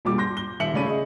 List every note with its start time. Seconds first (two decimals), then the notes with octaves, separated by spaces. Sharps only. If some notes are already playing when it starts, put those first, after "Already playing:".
0.05 E1 A#2 G3 D6
0.18 C6 G6 A#6
0.37 G7
0.60 D#1 D#2 E5 C#7 F#7
0.74 C#3 A3 C#4 D5 B5 D#7
0.86 G#4 D#5